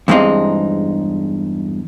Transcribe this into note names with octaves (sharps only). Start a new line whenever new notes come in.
E2 G2 G#3 C4 D#4